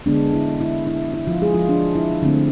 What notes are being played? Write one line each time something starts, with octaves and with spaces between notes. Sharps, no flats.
D3 G#3 B3 D4
E4
E4
E4
E4
F3 F4
G#3 G#4
F3 F4
D4
E4
D3 A3 C4